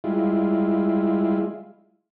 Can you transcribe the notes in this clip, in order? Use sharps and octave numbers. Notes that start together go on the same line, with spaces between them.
G3 G#3 E4 F4